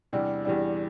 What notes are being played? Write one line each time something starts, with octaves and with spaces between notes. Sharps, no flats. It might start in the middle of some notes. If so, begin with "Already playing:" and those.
E2 C3 E3 G3 D4
E2 C3 E3 G3 D4